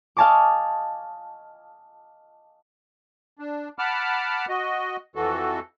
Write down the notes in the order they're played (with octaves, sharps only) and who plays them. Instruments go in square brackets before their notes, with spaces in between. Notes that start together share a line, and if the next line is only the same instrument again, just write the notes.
[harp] D#5 F5 G#5 A5 C#6 D6
[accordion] D4
F#5 A5 B5 D6 F6
F#4 D#5
F2 E3 F#4 A4